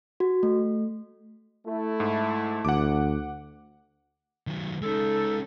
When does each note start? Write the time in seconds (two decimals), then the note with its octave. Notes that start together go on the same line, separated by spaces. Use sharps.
0.20 F#4
0.43 A3
1.67 A3 E4
2.00 G#2
2.65 D2 F#5 D6
4.47 D#3 F#3
4.82 G#3 C#4 D#4 A4